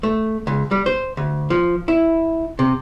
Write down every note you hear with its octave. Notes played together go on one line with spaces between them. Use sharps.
A3
C#2
G3
C5
D2
F3
E4
C3